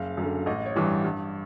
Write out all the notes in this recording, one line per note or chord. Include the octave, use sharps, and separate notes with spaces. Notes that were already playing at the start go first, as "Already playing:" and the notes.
Already playing: F#1 F5
F#2 D3
A1 D#5
C#5
G2 E3 G3
G2